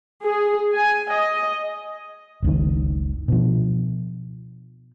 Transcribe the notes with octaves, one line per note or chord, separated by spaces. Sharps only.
G#4
G#5
D#5
F#1 C#2 D#3
B2 F3